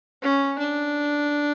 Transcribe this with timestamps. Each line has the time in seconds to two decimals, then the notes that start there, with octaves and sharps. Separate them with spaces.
0.23 C#4
0.59 D4